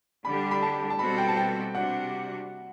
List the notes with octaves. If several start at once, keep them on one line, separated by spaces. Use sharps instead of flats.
D3 G3 D4 G4 B5
B5
A5
A5
B2 G3 C4 F#4 A4 B5
G5
A5
G5
C3 G3 D4 F#4 F#5